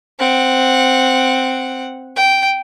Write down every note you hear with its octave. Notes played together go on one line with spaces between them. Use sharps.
C4 F#5
G5